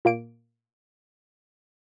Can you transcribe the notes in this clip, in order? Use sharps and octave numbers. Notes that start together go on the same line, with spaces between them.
A#2 A#3 D7